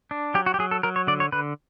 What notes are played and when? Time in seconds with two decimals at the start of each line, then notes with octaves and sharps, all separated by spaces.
0.11 D4
0.34 F#3 G4
0.46 F#4
0.54 G4
0.59 F#3 G#4
0.71 A4
0.83 F#3 A#4
0.96 C#5
1.07 D3 D5
1.20 C#5
1.32 D3 B4